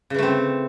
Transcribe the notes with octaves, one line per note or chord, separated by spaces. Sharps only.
C#3 E3 A3 C4